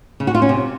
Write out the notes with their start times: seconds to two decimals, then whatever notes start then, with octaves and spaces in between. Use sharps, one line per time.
0.20 C#3
0.27 F#4
0.35 F4
0.42 C#4
0.49 C3